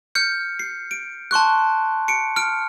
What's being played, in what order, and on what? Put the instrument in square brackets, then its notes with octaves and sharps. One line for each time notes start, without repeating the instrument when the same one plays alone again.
[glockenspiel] F6 G6 C#7
C7
D7
A5 C6 C#6 F#6
C#7 D7
F6 D7